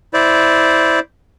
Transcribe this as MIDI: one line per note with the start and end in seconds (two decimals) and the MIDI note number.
0.14 1.00 64
0.14 1.00 72
0.14 1.00 74